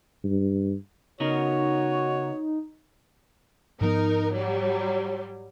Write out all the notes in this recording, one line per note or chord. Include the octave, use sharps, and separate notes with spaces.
G2
C#3 B3 D#4 F#4 A#4 C#5
G#2 F3 B3 D#4 A#4
F#3 G3